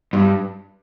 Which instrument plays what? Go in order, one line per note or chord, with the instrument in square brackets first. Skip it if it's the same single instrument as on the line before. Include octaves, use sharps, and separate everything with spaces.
[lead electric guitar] G2